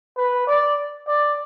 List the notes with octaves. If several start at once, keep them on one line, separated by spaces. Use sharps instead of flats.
B4
D5
D5